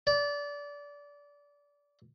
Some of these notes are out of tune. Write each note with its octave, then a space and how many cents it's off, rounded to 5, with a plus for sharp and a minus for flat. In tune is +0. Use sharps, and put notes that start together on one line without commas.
D5 -25